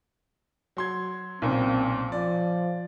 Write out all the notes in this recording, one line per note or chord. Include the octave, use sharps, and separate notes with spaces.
F#3 C6 G#6
B1 A#2 C#3 C4
F3 D5